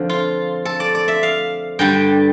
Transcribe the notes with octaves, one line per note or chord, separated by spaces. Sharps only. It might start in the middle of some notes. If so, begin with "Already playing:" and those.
Already playing: F2 D3 F3
F4
A4
D5
D5
E5
F5
G2 D3 G3 G5